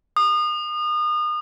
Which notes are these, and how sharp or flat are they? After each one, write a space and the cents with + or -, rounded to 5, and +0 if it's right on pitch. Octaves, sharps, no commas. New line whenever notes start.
D#6 -35